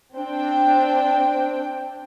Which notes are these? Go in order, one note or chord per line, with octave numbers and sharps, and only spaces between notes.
C4 D4 G5